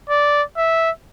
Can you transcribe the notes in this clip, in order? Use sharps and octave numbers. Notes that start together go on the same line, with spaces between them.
D5
E5